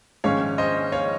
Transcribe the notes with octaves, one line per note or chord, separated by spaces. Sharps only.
A#1 G#2 D#3 G#3 C#4 C#5 F5
C5 D#5
C#5 F5